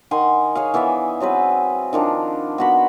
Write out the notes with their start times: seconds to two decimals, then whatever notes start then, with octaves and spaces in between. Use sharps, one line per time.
0.11 D#3 F#5 G#5 C6
0.55 G#4 C#5 F5
0.74 E3 B3 D5 E5
1.20 F#3 C4 G#4 B4
1.93 D#3 F3 D4
2.58 B3 F#4 B5